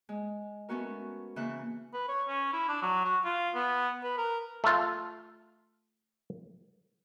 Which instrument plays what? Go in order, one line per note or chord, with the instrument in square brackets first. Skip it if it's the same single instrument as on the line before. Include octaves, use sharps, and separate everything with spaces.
[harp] G#3
A3 B3 C#4 F#4 A#4
C#3 E3 A#3 E5 F#6
[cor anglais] B4
C#5
C#4
E4
D4
F#3
F#4
F4
B3
B4
A#4
[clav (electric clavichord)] A3 F4